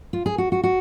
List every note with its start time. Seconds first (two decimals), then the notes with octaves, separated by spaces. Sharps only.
0.13 F4
0.26 G#4
0.38 F#4
0.52 F#4
0.63 F#4